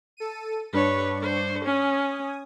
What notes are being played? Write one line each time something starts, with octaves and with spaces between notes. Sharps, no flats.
A4 D#7
G2 D4 B4 C#5 C#6
C5
C#4 G#5 D#6